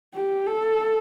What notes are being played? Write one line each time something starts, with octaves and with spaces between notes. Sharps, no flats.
G4
A4